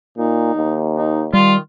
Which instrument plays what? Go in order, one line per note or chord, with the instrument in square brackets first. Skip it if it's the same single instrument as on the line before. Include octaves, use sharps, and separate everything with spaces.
[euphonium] A#2 [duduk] D#4
[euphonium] D#2
[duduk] D#4
[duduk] D#3 [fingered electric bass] G3 [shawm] F4